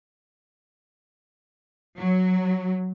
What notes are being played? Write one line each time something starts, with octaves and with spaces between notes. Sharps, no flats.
F#3